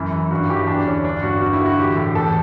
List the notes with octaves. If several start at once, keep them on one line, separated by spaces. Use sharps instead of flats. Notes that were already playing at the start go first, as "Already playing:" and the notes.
Already playing: F#2 E3 E4
E3
G2 F#4
E3 G4
E2 D4
D3 C#4
G2 D4
G2 F#4
G2 F#4
E4
D3
F#4
E3 G4
A2
E2 A4